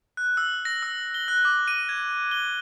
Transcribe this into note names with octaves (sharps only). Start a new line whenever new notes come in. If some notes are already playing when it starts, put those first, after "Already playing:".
F#6
E6
A#6
E6
G7
F#6
D6
D#7
G#6
G7